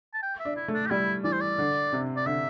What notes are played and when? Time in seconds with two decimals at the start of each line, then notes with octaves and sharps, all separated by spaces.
0.14 A5
0.22 G5
0.39 E5
0.45 D4
0.56 E4
0.68 A3
0.73 D4
0.86 G4
0.90 G3 E4
1.24 E3 D5
1.32 C5
1.41 D5
1.58 D3
1.93 C3
2.16 D5
2.26 D3 E5